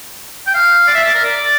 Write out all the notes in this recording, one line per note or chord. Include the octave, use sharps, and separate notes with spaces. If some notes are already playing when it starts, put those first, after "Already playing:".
G5
F5
D5
E5
D5
A#4
D5